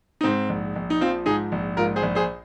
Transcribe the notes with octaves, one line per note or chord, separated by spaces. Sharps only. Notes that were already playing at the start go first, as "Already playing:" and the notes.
D#4
G#2 C4
A#1
A#1
D#4
F3 C4 F4
G#2 D#4 G#4
A#1
G#2 F4 A#4
G#4 C5
A#1
G#4 C5